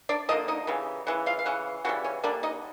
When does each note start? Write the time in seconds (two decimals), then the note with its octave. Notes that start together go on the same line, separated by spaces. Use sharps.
0.09 D4 D5
0.29 D3 F3 A#3 D#4 D#5
0.48 D#4 D#5
0.67 C#3 E3 G3
1.07 C#3 E3 F#5
1.26 F4 F5
1.39 F5
1.46 C#3 E3 F#5
1.85 C#3 E3 G3 F#4 F#5
2.04 C#4 C#5
2.24 D3 G3 A#3 D4 D5
2.43 D#4 D#5